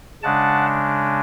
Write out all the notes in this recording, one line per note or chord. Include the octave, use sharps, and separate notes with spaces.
C#3 G#3 D4 F#5 A5